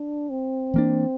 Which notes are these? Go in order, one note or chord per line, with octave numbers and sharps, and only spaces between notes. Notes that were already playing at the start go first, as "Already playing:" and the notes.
Already playing: D4
C4
E3 A#3 D4